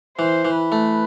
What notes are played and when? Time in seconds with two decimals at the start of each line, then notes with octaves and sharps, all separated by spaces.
0.18 E3 C5
0.45 E3
0.58 B4
0.72 A3